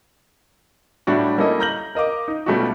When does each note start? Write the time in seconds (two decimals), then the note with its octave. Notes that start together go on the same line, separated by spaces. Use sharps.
1.07 A2 G3 D4 E4 F#4
1.38 G3 A#3 C#4 E4 A4 D#5
1.60 A#5 F6 G6 A#6 F#7
1.95 A#4 D#5 F5 D6
2.28 D#4
2.46 B2 G3 A3 C#4 F4 F#4